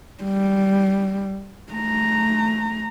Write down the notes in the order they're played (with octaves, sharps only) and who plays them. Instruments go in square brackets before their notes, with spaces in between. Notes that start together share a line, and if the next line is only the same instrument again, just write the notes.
[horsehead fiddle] G3
A3 A#5